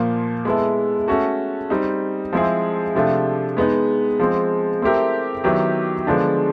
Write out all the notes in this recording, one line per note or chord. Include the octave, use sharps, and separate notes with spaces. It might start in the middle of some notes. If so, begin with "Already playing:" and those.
Already playing: A#2 F3 A#3
G#3 B3 E4 A4
A3 C#4 F#4 A4
G3 C4 D#4
F3 G#3 C4 E4 G#4
C3 F3 A3 D4 F4
G#3 B3 D#4
F3 G#3 C4
A3 C4 E4 G4 A#4
D#3 F#3 B3 E4 G4
D3 F3 G#3 B3 D4